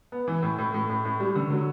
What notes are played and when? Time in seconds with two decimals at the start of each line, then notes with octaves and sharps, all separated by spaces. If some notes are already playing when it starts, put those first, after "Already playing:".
0.12 B3
0.28 E3
0.43 A2
0.58 A2
0.74 A2
0.90 A2
1.05 A2
1.20 G3
1.36 D3
1.50 F#3